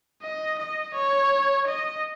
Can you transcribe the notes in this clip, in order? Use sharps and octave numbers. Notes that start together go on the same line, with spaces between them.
D#5
D#5
C#5
D#5